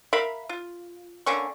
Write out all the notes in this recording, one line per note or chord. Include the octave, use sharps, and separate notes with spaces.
A#4 E5 F5 B5
F4
D3 A#3 C#4 C#6